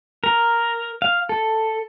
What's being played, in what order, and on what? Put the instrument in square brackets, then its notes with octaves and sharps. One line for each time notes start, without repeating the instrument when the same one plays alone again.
[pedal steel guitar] A#4
F5
A4